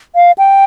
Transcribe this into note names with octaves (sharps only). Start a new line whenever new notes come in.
F5
G5